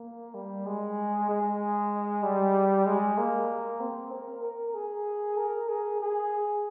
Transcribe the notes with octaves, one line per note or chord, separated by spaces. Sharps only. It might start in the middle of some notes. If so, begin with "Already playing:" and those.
Already playing: A#3
G3
G#3
G#3
G3
G#3
A#3
C4
A#4
A#4
G#4
A#4
G#4
G#4